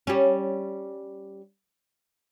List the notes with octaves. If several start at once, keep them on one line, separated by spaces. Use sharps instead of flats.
G3 C#4